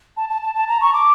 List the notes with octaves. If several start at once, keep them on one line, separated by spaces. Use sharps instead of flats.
A5
A5
A5
A5
A#5
C#6
D6